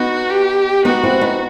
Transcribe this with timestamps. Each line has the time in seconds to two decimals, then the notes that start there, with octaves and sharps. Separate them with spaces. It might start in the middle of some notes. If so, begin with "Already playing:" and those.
Already playing: B3 D#4 F#4
0.30 G4
0.85 B3 D#4 F#4
1.03 C4 E4
1.21 B3 D#4